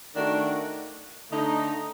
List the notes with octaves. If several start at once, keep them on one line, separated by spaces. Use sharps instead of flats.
D#3 A3 D4 F#4
D3 A3 D#4